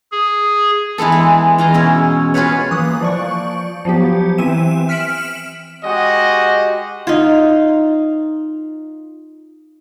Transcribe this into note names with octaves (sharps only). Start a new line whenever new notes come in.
G#4
E3 G#3 B3 A4
G#3
E2 F4 D#5 A#5 C6
B2 C#4 E4
C#4 F4 F#4 G#4 B4 C#5
E3 A#3 D#6 F#6
F3 D5 C#6
F3 F#3 B3 G4
E3 C4 E5 D#7 E7
F6 B6 C#7 D7 E7 F#7
G#3 F#4 G4 D#5
D#4 F4